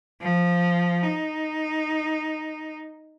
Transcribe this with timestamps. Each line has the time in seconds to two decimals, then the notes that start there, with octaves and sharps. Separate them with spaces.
0.21 F3
1.03 D#4